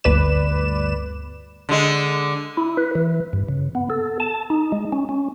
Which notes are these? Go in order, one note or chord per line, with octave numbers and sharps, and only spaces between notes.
G1 D2 B4 D5 E7
D3 G#3
E4
B4
E3
G2
C#3
B3
A4
A5
D#4
G#3
C#4
C#4